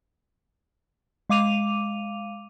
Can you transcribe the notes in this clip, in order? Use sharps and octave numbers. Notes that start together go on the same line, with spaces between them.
G#3 F5 D6 D#7 F7